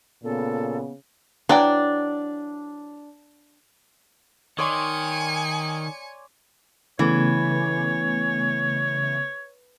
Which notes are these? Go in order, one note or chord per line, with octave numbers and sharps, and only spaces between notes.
A#2 C#3 B3 A4
E3 F#3 D4 G5
D#3 C#5 D5 G#5 C6 C#7
C#3 E3 A3 B3 C#5